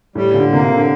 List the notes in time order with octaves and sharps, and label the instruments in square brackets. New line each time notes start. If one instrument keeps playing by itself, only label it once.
[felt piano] A2 [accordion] G3
[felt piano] A#2 [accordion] D3
[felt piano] C3 [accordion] A#3
[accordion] D3